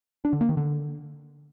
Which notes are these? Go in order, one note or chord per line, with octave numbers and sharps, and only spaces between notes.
D4
D3
A#3
D#3
D3